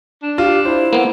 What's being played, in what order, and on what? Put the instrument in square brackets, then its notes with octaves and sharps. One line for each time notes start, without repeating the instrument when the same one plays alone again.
[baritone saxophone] D4
[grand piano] F4 [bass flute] G4
[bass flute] E4 [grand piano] C5
[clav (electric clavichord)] A#3 B3